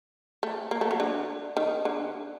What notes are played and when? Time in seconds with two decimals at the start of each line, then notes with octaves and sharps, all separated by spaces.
0.43 A3
0.71 A#3
0.81 A3
0.91 F#3
1.00 D3
1.57 D#3
1.85 D3